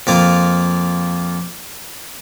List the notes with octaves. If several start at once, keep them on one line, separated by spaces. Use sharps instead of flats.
F2 A#3 F4